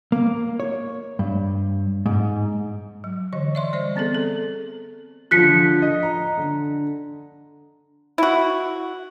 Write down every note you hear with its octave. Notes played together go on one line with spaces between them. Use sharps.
A#3
C#5
G2
G#2
F#3
D3 E3 D#5
D5 E5 C6
G3 C5 D5
B3 C4 G#4 A4
A4
D3 F3 F4 F#6 B6 C#7
D#5
A#5
D3
E4 F#4